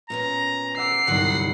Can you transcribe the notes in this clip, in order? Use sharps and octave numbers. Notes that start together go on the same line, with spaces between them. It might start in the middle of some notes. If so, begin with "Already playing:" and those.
A#2 B3 C#4 A#5
E5 F#5 D6 C7
G1 C2 A#2 F#3 D#4 F#5 A#5